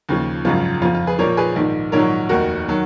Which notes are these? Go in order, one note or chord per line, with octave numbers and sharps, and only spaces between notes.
D#2 C#3 F3
G#1 F#2 C#3 F3 F4
F2 F3 F4
F4
G#4 B4
A#1 A#2 F3 A#4 C#5
G#4 B4
A#1 G#2 D#3
A#1 G#2 D#3 F#3 A#4 C#5
F1 D#2 D#3 F#4 A#4
D#3 F#3